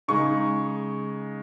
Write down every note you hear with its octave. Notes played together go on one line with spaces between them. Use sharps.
C#3 G#3 D#4 C#6